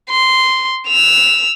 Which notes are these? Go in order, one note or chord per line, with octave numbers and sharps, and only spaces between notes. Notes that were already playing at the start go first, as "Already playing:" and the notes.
C6
E6 F7